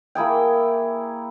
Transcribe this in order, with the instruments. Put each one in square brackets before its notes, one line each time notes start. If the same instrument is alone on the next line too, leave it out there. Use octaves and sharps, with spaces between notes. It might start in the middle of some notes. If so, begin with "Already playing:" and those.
[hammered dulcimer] A#3 E4 G#4 G5